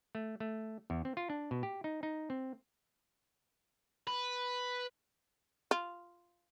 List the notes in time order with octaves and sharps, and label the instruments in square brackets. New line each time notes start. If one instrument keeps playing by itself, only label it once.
[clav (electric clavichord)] A3
A3
E2
C4
F4
D4
B2
G4
D#4
D#4
C4
[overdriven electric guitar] B4
[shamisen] F4